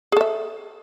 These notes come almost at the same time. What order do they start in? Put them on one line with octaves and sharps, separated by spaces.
G#4 A4 E5